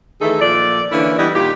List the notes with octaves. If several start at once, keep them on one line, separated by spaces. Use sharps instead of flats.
D#3 E3 A3 D#4 G#4 A4
A#2 F3 A4 D5
D3 E3 A#3 C#4 E4
E3 G3 B3 E4 D5 D#5
A#2 D#3 F4 G4